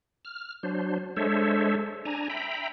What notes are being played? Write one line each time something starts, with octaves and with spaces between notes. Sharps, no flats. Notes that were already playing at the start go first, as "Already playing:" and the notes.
F6
F#3 D4 C5
G#3 D4 A4 C5 C#5 E5
D4 G#5 A#5
E5 G5 A#5 B5